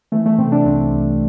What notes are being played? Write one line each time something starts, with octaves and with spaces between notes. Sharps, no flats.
E3 A3
A3
C3 C4
D4
C2 C4
C2